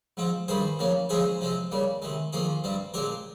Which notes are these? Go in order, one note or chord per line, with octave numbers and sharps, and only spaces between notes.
G#2 F3 C4
G2 D#3 G3 G#4 C5
C#3 F3 A#3
C#3 F3 G#3 C4 G#4 C5
C3 F3 G#3 C4
C#3 G3 A#3
C3 D#3 G#3
F2 D#3 A#3 F4 G#4
G2 G3 C4
A#2 G#3 C4 G4 A#4